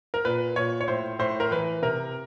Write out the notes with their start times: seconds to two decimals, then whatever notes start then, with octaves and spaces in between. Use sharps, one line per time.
0.14 A#4
0.25 A#2 B4
0.56 A#2 C#5
0.81 C#5
0.88 A2 C5
1.19 A2 C5
1.40 A#4
1.51 E3 B4
1.82 C3 A#4